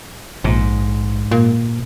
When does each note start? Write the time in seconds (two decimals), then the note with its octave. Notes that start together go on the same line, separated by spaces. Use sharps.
0.44 A#1 G#2
1.31 A#2